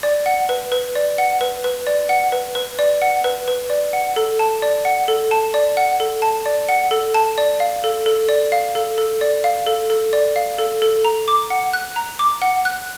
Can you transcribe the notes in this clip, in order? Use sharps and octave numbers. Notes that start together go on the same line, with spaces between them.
D5
F#5
B4
B4
D5
F#5
B4
B4
D5
F#5
B4
B4
D5
F#5
B4
B4
D5
F#5
A4
A5
D5
F#5
A4
A5
D5
F#5
A4
A5
D5
F#5
A4
A5
D5
F5
A4
A4
D5
F5
A4
A4
D5
F5
A4
A4
D5
F5
A4
A4
A#5
D6
F#5
F#6
A#5
D6
F#5
F#6